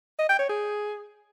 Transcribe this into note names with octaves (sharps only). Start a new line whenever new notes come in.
D#5
G5
C#5
G#4